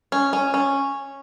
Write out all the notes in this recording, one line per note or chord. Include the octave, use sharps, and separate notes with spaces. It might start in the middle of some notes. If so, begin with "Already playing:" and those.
C#4
C#4
C#4